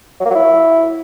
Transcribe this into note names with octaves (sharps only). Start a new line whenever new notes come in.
F#3
A#3
F#3
E4